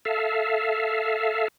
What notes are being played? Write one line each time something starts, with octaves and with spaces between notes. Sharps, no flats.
A4 E5 F5